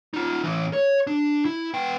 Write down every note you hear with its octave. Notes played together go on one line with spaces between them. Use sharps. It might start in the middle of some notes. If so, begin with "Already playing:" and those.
D#4 F4
A2 E3
C#5
D4
E4
B3 G5